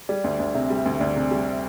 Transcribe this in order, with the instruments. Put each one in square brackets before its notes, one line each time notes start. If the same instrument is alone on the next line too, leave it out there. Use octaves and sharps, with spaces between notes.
[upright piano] G3 [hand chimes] D5
[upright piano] D2
D2
[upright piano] C3 [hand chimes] E5
[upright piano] G3
D2
[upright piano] D2 [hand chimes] D5
[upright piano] C3
G3
[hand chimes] E5